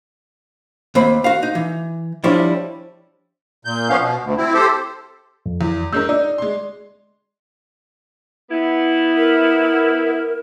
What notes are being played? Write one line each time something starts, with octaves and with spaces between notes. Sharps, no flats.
D#2 C4 B5
F#4 F5
D#4
E3
F3 G3 C#4 D4 E4
A#2 G6
F3 B3 C#4 F5
B2
D2
C4 E4
G4 A4 C5
F2
E2
G#3 C#4 A#4 E6 G6
D#4 D5
G#3 C6
B3 E4
A#4